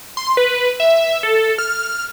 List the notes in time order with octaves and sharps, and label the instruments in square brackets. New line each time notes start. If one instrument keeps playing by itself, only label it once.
[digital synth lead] C6
B4
E5
A4
F6